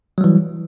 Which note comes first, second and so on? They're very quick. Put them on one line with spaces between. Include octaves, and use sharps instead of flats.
F#3 G3 E3